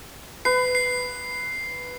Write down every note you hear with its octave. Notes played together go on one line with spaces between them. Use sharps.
B4 C7
C7